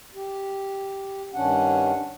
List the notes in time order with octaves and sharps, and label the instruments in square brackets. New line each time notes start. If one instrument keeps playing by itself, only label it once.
[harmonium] G4
G2 D#3 C#4 D4 F#5